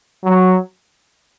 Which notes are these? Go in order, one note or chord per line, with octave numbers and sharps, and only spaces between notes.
F#3